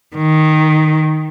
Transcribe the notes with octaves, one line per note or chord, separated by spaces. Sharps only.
D#3